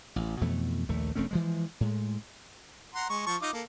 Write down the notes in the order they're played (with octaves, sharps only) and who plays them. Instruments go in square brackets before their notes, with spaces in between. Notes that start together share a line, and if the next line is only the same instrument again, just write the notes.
[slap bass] A1
F2 B2 E3 A3
A#1 D#2 A3
E1 A3 C4 C#4
E3 F3 G#3
A2 G#3
[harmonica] F#5 A#5 C6
G#3 C#6
F3 A5 C#6
D#4 F4 D6
A#3 A4